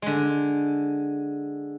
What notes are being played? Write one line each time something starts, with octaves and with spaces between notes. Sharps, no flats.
D3 G#3